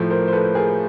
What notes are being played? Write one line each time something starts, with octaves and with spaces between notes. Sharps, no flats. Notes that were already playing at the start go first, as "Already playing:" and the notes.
Already playing: A2 F3 A3
A#4 C5
C5
A4 B4
G#4 A#4